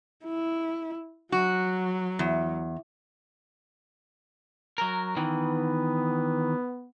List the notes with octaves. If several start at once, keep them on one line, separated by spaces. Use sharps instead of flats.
E4
F#3 F#4
E2
F#3 A#4
D#3 E3 B3